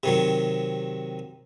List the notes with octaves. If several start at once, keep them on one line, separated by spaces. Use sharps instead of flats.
C3 D#3 F#3